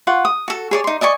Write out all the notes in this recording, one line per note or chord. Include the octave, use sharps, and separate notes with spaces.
F4 F#5 C#6
D#6
F#4 A4
G#4 C#5 D5
D#4 C6
D5 D#5 G#5 C#6